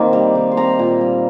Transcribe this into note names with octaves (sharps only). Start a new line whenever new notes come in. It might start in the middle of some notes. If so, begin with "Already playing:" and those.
Already playing: D#3 A#3 C4
G3
D#3
C6
C4 A#5
A#2
G3